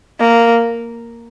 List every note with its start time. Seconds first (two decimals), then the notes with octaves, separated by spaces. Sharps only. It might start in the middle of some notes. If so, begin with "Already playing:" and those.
0.20 A#3